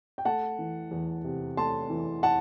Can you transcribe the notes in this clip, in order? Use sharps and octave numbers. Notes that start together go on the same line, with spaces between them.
G5
A3 F#5 A5
E3
E2
C3
A3 A5 C6
E3
F#5 A5